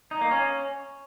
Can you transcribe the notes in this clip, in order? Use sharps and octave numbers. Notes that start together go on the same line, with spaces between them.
D#4
A#3
C#4